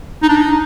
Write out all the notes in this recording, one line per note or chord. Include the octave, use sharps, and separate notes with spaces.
D#4
D4
D#4